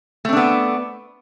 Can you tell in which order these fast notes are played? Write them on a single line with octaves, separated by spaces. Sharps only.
A3 C4 D4 B3